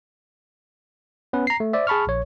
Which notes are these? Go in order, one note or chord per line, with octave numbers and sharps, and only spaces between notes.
B3 C#4 B4
A#5 C7
A3
C5 D5 E5
G#4 A5 B5 C#6 F6
A#1 C#5